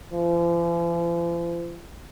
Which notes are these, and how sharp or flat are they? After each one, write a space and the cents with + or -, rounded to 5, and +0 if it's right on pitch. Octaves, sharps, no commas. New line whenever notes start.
F3 -45